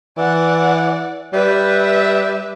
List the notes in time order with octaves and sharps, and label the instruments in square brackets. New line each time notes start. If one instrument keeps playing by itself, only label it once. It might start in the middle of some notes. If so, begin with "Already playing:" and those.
[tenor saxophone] E3 [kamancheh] D5 F#5
[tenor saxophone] G3 [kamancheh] B4 E5